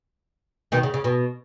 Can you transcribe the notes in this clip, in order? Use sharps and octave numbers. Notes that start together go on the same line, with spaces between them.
B2 D#3
C#3
C#3
B2